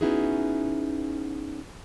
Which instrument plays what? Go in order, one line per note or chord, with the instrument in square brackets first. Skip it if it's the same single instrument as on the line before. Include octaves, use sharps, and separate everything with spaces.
[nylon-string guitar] B3 C#4 D#4 E4 F#4 G#4